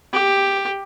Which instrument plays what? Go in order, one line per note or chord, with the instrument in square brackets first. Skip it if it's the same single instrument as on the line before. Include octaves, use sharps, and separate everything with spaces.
[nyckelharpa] G4